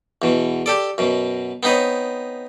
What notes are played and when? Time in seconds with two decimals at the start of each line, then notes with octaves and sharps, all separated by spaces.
0.22 E2 B2
0.66 G4 A4 D5
0.98 F#2 B2
1.63 B3 C4 D#4 B4 C#5